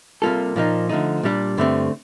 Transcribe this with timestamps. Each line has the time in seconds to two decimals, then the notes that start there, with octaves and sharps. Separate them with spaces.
0.22 C3 G3 A#3 F4 A4
0.56 A#2 F3 A#3 D#4
0.89 D3 F3 A3 D#4
1.23 A#2 G3 D4
1.57 G2 D3 A3 C4